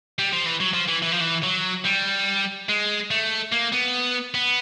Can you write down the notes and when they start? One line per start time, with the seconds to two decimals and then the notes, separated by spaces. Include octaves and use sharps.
0.19 G3
0.32 F3
0.46 E3
0.60 F#3
0.74 F3
0.88 E3
1.02 E3
1.12 F3
1.21 E3
1.43 F#3
1.85 G3
2.69 G#3
3.11 A3
3.52 A#3
3.73 B3
4.34 B3